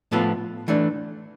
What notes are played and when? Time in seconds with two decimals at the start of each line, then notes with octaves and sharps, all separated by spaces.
0.12 A2 F3 B3 F4 A4
0.68 E3 A3 D4